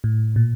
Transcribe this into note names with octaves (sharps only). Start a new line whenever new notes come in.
A2
A#2